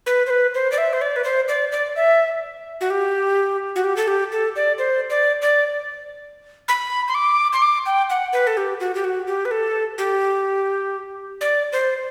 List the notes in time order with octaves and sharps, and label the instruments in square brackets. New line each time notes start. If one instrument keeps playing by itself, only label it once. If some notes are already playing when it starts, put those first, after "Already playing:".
[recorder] B4
C5
B4
C5
D5
E5
C5
D5
B4
C5
D5
D5
E5
F#4
G4
F#4
G4
A4
G4
A4
D5
C5
D5
D5
B5
C6
D6
C6
D6
G5
F#5
B4
A4
G4
F#4
G4
F#4
G4
B4
A4
G4
D5
C5